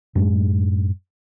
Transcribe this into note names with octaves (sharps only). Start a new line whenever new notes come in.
F#2 A2 G#3